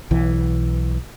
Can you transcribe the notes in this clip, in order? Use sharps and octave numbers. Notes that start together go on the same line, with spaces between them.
B1 E3